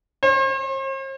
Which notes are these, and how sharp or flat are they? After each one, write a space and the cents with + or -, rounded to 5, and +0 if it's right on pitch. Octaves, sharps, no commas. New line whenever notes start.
C5 +45